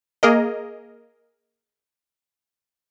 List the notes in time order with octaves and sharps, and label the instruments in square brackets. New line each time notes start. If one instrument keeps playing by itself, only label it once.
[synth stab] A#3 G#4 A#4 D#5